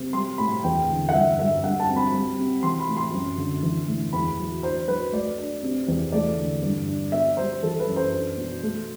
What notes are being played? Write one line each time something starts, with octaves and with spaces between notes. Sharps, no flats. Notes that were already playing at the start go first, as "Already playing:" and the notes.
Already playing: C3
G3 C6
A2 B5
E2 G5
D3
F#5
G2 E5
G2 E5
G2 F#5
A5
C4
B5
G3
C3
E3 C6
B5
A2
C6
F#2
D3
E3
A2
E2 B5
F#3
D4 C5
F#3 B4
A3 D5
D4
C3
E2
A3 D5
D3
G2
D4
B3 E5
G3 C5
E3 A4
B4
F#2
C5
D4
B2
A3